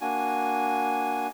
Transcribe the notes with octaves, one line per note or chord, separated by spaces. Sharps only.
A#3 D4 F#4 G#5